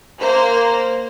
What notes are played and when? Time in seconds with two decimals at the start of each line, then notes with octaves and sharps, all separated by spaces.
0.19 A#3 C5